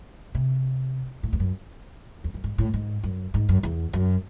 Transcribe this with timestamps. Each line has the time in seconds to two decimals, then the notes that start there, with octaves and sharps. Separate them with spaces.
0.35 C3
1.23 A2
1.33 E2
1.40 F#2
2.24 E2
2.34 F#2
2.44 G#2
2.58 A2
2.74 G#2
3.04 F#2
3.34 G#2
3.49 F#2
3.63 E2
3.93 F#2